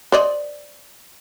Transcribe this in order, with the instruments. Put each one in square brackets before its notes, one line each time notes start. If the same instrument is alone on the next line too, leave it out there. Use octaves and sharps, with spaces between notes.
[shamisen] C5 D5 D#5